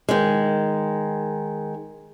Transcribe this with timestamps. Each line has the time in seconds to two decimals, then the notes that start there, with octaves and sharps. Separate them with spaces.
0.09 D#3 G#3